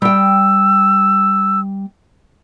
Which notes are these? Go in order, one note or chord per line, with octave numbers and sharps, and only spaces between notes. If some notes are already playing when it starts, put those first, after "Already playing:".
G3 G5 E6